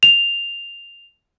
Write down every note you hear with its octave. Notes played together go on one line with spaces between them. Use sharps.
F7